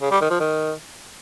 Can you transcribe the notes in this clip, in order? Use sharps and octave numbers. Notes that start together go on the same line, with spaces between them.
C#3
G3
D#3
F3
D#3